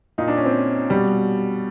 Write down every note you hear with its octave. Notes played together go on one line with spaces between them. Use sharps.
A#2 D#4
D4
C#4
C4
B2 G3